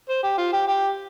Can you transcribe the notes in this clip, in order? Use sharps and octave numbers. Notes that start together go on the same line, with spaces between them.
C5
G4
F4
G4
G4